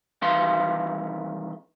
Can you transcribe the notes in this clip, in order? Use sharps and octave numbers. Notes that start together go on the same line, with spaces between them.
C2 D#3 E3 B4 F5 C6